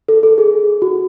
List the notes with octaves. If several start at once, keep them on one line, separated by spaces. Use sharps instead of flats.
A4
A4
G#4
F#4